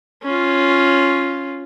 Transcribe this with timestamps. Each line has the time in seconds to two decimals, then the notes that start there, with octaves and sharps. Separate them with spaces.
0.23 C#4 F4